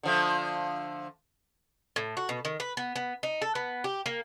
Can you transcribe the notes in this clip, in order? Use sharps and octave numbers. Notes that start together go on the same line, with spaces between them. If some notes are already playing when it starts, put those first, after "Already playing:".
D3 F3 A3
A2
F#4
B2
D#3
B4
B3
B3
D#4
A4
B3
G4
A#3